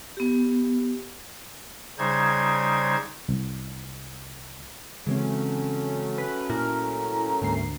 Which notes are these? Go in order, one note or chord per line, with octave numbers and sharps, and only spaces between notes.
B3 G4
C#3 G3 D#4 C5 G#6
C2
C#3 E3 F#3 G#3 A3 C4 C#4
B4
A#2 E4 A#4
D2 G#2 A#3 C7